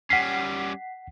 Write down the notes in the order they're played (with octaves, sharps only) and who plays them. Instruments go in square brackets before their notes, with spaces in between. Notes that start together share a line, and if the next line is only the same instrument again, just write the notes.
[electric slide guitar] G3 C#4 [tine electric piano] F#5 B6 C7